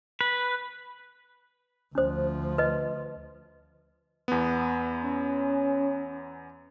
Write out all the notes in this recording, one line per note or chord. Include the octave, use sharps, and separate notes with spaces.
B4
D2 F3 C#4 C5
B4 D#5
E2 B3
C#4